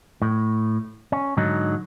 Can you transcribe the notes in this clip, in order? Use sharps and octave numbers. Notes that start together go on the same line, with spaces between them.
A2
C#4
G#2 D3 F#3 D#4